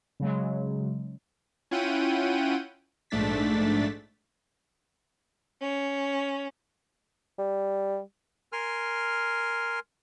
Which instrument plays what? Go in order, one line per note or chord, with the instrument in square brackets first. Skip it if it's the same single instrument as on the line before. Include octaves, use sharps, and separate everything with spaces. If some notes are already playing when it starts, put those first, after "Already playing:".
[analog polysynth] C#3 F#3 G#3
C#4 E4 F4 F#5 G5 D#7
A#1 G#2 A3 D4 A6 B6
[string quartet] C#4
[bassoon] G3
[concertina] A#4 G#5 C6 F6